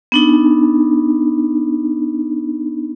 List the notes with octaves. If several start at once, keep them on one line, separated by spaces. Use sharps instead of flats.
B3 D4 D#4